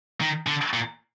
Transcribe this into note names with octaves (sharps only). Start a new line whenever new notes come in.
D#3
D3
A#2